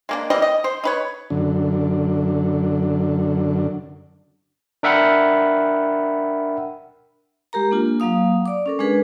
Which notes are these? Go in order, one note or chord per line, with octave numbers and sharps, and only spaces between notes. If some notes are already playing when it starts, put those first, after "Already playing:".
G#3 A#3 D4
E3 G3 C4 D#5
D#5
C5
D#4 B4 C#5
F#2 D3
D4 A#4 E5 F#5 G5 B5
G#3 G4 A#4 A#5
A#3 D4 F4
F#3 A#3 F5 D#6
D5 D6
C#4 A4 A#4
G#3 D4 G#4 B4